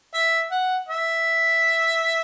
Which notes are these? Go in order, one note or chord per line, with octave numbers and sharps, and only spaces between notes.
E5
F#5
E5